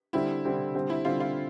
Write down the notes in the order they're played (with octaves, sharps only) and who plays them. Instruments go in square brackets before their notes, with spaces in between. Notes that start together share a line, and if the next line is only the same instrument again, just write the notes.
[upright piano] D3 G3 C4 [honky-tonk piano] E4
[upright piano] D3 G3 C4
D3 G3 C4
[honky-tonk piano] E4
[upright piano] D3 G3 C4 [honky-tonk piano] F4
[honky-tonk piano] F4